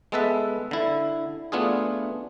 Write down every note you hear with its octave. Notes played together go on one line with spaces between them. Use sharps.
G#3 B3 A4 B4 E5
D3 E4
A3 B3 D4 F4 G#4